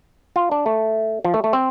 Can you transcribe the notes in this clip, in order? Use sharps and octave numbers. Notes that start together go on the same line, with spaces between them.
F4
D4
A3
F3
A3
A3
C4